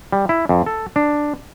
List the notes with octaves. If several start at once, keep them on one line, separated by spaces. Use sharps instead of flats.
G3
E4
F2
A4
D4